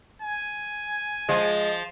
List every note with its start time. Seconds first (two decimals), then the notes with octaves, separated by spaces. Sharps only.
0.22 G#5
1.29 F3 G#3